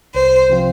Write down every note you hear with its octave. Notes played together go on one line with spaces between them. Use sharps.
C2 C5
C3 F3 C4 F4